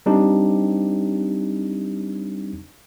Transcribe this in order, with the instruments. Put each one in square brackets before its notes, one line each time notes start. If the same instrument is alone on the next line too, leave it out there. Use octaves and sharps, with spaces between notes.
[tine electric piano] G3 C4 D4 D#4 G4